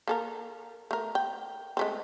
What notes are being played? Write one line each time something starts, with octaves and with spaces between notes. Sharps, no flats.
A#3 A4 A#4
A3 A#4
G5
G#3 A3 C4